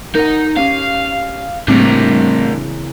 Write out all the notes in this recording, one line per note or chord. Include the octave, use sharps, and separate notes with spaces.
D#4 A#4 F#5
C#4 G4 F5
A2 C#3 E3 G3 A#3 C4 D4 A#4